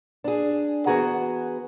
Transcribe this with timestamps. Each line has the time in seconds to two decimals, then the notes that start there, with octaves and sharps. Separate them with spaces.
0.24 D4 G#4
0.87 E3 B3 F#4 G#4 A#5